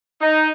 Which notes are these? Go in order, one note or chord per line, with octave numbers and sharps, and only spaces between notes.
D#4